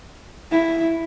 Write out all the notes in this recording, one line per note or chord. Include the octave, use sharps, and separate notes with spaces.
E4